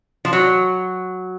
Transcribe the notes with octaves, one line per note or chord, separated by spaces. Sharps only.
F3
F#3